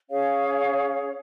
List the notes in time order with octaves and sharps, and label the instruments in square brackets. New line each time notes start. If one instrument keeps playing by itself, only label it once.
[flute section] C#4 G#4 C#5 F5